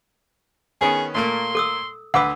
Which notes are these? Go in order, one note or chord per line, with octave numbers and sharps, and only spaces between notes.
D#3 B3 C#4 G#4
A#2 A3 A#3 C6
A4 D#6 E6
D2 B4 F#5 D6 E6